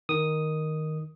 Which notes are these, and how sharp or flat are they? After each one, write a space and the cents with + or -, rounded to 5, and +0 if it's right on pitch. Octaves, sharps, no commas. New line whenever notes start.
D#3 +0 D#6 +0